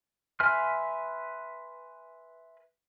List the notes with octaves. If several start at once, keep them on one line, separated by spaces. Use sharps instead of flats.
B4 E5 G#5 C6 F6